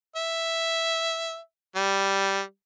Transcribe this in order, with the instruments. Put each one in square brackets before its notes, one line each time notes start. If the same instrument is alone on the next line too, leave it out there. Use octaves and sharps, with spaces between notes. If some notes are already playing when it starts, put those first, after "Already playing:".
[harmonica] E5
G3